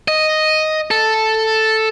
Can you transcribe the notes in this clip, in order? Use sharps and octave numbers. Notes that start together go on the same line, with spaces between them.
D#5
A4